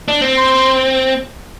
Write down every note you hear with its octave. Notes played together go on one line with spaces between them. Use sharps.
D4
C4
C6